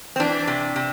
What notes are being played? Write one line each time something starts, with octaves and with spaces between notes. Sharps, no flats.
C4
E3 D4
C3
C3